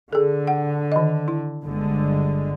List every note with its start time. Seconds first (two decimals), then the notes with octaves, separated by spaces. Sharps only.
0.13 D3 G#4 A4
0.47 F#5
0.92 D#3 D#5
1.28 E4
1.64 G1 D3 G#3